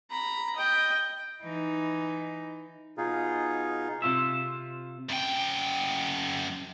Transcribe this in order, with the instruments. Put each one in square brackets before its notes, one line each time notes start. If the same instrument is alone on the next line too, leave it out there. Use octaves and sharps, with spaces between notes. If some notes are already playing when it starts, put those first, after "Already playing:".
[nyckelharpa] A#5 B5
D#5 G5
[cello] E3 D#4
[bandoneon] B2 D#4 F4 G#4
[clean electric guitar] C3 F4 E5
[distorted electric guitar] F#2 G5